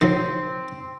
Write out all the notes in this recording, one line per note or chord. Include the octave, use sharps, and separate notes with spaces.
D#3 F3 F#3 C4